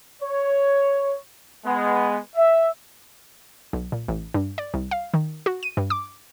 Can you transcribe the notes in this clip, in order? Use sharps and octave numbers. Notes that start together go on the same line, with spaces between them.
C#5
G#3 B3
E5
B1
A#2
A1
G2
D5
C2
F5
D#3
F#4
D#7
G2
D6